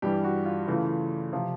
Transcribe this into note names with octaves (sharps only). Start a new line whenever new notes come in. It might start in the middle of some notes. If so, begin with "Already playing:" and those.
G2 E3 G3 G4
F#4
F4
C#3 E3 A3 F4
C3 F3